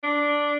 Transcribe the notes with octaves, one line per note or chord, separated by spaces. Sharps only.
D4